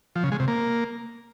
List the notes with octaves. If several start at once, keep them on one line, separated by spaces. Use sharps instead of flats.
F3
C#3
G#3
C3
A#3